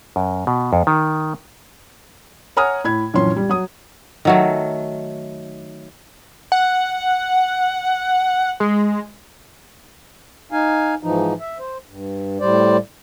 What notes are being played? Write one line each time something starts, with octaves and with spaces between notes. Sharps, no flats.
F#2
B2
F2
D#3
C#5 F#5 G#5 A#5 D#6 F6
A2 B5 G#6
A#1 F#2 E3 C#4 C6
G3
F#3 D#6
D#3 F#3 A3
F#5
G#3
D#4 F5 G#5
G#2 E3 F3 D#4
E5
C5
G2
A2 G3 C5 D5